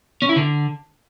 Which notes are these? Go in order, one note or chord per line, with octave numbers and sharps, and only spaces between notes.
C#4
E4
D3